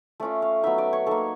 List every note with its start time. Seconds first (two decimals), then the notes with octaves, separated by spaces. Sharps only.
0.20 A3 C#4 F4 D5
0.42 F5
0.63 F#3 B3 D#4 E5
0.78 D5
0.93 C#5
1.07 A#3 D#4 A4